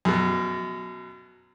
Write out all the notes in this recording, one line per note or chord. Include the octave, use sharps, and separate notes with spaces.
F#2 B2